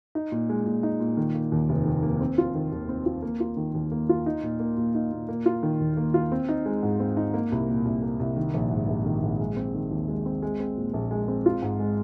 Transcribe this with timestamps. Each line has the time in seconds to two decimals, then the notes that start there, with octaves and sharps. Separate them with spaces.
0.15 D#4
0.32 A#2
0.50 G#3
0.66 A#2
0.83 D#4
1.00 A#2
1.17 D#3
1.34 A#3
1.52 D#2
1.69 F1
1.86 D#3
2.03 A#3
2.21 C4
2.38 F4
2.55 D#3
2.72 D#2
2.89 C4
3.06 F4
3.22 A#3
3.40 F4
3.57 D#3
3.74 D#2
3.92 A#3
4.09 F4
4.26 D#4
4.43 A#2
4.60 A#3
4.77 A#2
4.95 D#4
5.12 A#2
5.28 A#3
5.46 F4
5.63 D#3
5.80 D#2
5.97 A#3
6.14 F4
6.32 C4
6.49 D#4
6.66 G#3
6.83 G#2
7.00 C4
7.17 D#4
7.34 A#3
7.52 C2
7.68 A#2
7.85 C2
8.03 A#3
8.20 C2
8.37 D#3
8.54 A#1
8.71 G#2
8.88 A#1
9.06 D#3
9.23 A#1
9.40 G#3
9.56 C4
9.74 D#3
9.91 D#2
10.08 G#3
10.26 C4
10.42 G#3
10.60 C4
10.77 A#2
10.94 A#1
11.11 G#3
11.28 C4
11.46 F4
11.62 G#2
11.79 G#3